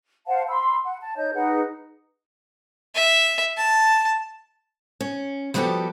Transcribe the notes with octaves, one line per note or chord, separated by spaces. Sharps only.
C5 F5 F#5 A5
B5 C6 E6
F#5
A5
D#4 C#5 D#5 G6
D#4 G#4 B4 F#5
E5
A5
C#4
F3 G3 B3 F#4 G4 A4